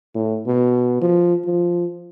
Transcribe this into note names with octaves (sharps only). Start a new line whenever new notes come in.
A2
B2
F3
F3